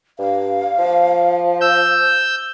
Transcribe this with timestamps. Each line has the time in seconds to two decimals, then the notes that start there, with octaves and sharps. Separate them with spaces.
0.19 G2 F5
0.79 F3
1.61 E6 G6